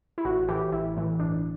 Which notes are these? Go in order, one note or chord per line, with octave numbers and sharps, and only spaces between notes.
E4
A1 F#4
A2 E3 G4
A1 E4
A2 E3
G1 D4